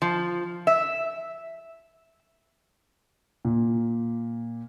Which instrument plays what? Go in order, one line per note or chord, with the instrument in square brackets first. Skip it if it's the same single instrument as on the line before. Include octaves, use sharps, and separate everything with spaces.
[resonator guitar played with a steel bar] F3
E5
[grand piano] A#2